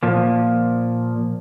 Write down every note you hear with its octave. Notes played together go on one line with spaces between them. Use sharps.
A#2 F3 A#3